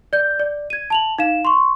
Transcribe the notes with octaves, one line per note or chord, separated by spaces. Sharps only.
D5 G6
D5
G#6 D#7
A5 F7 F#7
D#4 F5 E7
C6 C#6